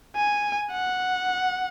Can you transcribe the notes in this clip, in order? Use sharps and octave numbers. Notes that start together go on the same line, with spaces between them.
G#5
F#5